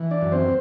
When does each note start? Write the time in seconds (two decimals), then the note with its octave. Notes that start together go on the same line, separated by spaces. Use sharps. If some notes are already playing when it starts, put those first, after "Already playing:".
Already playing: E3
0.11 D4 D5
0.22 F#2
0.32 C4 C5